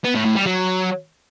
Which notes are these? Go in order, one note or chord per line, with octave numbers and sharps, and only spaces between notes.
B3
A2
A2
G3
F#3